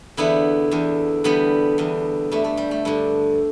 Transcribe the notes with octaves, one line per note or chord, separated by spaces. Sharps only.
E2 D3 B3 E4
E2 D3
E2 D3 G3 B3
E2 D3
G2 D3 A3
A3
G3
A3
G2 D3